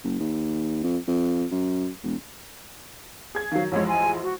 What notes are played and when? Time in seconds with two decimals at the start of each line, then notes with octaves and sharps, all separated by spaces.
0.04 F#1
0.20 D#2
0.83 F2
1.07 F2
1.51 F#2
2.03 E1
3.35 G#4 G#6
3.52 D#3 F#3 F5
3.72 A1 F2 G#3 C#5
3.88 G#5
4.22 F#4